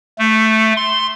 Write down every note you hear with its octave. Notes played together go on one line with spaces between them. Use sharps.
A3
C6